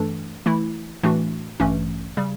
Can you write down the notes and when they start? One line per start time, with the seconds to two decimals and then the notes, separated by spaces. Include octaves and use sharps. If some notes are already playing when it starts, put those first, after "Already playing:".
Already playing: G2 E3 A3 D4 A4
0.46 E3 A3 E4
1.03 A2 E3 A3 D4 F#4
1.60 A1 G2 E3 A3 C#4
2.17 C#3 G3